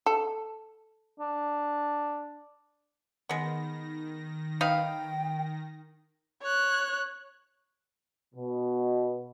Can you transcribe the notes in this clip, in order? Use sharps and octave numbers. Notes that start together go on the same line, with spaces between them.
A4
D4
D#3 G#3 B3 A#6
D#4 B4 F5 G5
C#5 F#6
B2